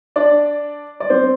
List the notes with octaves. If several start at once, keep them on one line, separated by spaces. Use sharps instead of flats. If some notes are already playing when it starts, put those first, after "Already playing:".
D4 D5
D5
C4 C5